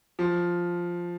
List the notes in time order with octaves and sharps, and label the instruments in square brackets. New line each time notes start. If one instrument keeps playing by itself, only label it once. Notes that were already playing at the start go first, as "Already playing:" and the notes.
[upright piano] F3